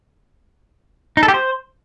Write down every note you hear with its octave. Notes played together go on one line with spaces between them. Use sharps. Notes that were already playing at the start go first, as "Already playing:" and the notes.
D#4
A4
G4
C5